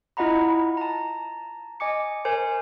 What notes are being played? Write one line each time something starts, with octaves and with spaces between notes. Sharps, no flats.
E4 F4 D#5 F#5 A#5 B5
A5 A#5
D#5 G#5 D6 C#7
A#4 C5 G#5